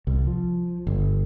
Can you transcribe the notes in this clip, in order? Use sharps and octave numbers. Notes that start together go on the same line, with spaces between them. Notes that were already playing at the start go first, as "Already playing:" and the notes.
C2
F3
G1